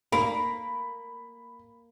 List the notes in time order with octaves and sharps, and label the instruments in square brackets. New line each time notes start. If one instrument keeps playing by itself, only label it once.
[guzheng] A#3 [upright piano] B5